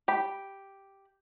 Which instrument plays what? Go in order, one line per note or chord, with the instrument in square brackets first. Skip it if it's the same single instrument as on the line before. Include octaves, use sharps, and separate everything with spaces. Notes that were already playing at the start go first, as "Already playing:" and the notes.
[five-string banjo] G4 B5